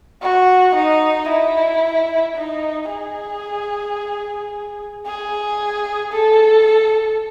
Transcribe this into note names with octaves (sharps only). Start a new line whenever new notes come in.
F#4
D#4
E4
D#4
G#4
G#4
A4